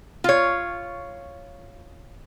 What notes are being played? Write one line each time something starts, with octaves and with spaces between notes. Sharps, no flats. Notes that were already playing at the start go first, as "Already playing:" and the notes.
F4 C#5